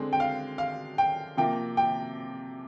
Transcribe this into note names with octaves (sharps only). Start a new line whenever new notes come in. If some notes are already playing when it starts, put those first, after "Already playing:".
Already playing: D3 G#3 C4
G5
F5
F5
G5
C3 F3 A#3 G5
G5